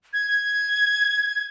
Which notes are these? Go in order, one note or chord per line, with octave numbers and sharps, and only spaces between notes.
G#6